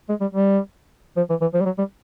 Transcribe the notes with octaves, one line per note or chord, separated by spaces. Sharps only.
G#3
G3
G3
F3
E3
E3
F3
G3
F#3
G3